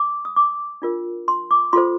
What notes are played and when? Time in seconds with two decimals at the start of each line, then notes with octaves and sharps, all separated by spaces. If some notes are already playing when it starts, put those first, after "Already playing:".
Already playing: D6
0.25 D#6
0.36 D6
0.82 D4 F4 A#4
1.28 C6
1.51 D6
1.73 F4 A4 C5 C6